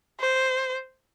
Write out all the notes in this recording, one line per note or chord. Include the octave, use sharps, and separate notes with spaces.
C5